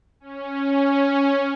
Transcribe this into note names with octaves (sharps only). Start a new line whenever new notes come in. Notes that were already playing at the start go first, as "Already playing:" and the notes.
C#4